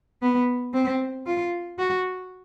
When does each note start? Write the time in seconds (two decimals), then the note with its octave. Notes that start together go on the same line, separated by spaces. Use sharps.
0.22 B3
0.73 C4
1.26 F4
1.78 F#4